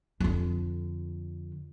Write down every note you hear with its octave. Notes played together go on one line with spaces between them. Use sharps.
F2 D3